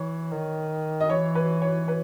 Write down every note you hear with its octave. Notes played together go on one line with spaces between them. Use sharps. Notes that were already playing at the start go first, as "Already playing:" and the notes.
Already playing: E3 C#5
D#3
D#5
E3 C#5
B4
C#5
B4